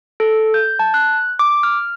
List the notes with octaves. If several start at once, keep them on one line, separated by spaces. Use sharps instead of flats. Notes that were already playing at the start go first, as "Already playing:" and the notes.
A4
G6
A5
F#6
D6
F6